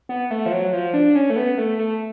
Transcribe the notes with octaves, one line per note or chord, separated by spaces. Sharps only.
B3
A3
F3
F#3
F3
D4
C#4
A3
B3
A3
A3